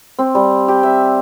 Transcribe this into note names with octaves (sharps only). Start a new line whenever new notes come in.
C4
G3
G4
E5